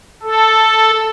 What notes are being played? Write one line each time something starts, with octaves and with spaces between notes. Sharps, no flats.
A4